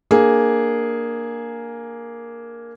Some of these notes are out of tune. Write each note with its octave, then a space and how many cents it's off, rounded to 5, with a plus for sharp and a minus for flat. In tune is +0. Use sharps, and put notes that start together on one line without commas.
A#3 +0 D4 +15 G#4 +0